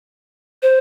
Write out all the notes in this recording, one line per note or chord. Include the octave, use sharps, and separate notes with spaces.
C5